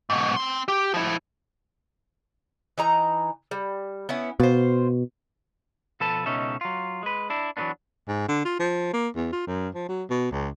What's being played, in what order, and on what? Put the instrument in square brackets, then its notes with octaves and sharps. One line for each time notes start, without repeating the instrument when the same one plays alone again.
[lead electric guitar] G#2 B2
C4 C6
G4
F3 E4
[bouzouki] E3 D#4 A#5
G3
B3 C#4 E4
[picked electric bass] B2 [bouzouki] F4 C5
[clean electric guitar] B2 F3 A4 B4 A5
C#2 B2 C#4 D#4 A4 E5
F#3 F4
G#3 B4
D4 E4
E3 F#3 G#3 A#3 B3 D4
[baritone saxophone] G#2
D3
F4
F3
A#3
E2
F4
F#2
F3
F#3
B2
C#2